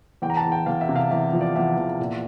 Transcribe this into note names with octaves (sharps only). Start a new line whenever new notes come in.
E2 G5
A#5
A5
E2
G5
E2 F5
E5
C3
F5
E2 E5
F3
D5
E2 E5
E2
A#2